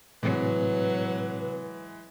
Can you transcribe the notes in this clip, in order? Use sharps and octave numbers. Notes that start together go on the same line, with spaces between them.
A2 C3 E3 F#3 G#3 C4 B4